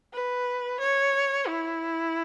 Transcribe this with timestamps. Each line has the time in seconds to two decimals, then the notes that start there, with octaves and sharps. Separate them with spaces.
0.13 B4
0.80 C#5
1.48 E4